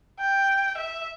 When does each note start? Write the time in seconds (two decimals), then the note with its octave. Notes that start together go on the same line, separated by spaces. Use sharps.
0.20 G5
0.78 E5